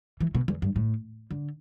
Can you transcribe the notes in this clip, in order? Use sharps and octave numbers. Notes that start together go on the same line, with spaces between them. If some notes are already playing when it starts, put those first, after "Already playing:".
E3
B2
E2
G2
A2
D3